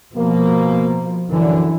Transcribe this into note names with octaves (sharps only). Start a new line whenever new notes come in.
B2 F3 A#3
F#2 D3 E3